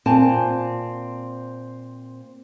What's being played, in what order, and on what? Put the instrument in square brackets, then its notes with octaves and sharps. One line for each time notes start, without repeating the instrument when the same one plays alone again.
[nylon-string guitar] A#2 C4 G#5 A5